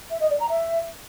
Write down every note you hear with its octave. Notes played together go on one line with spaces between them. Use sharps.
E5
D#5
D5
A#5
E5